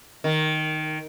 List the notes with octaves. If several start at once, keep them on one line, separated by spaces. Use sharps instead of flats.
D#3